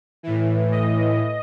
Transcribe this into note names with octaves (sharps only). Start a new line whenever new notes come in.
A2 E3
D#5